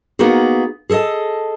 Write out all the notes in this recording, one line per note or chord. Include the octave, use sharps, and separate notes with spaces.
A#3 B3 D#4 F#4 G#4
G#4 A4 C5 D#5 A5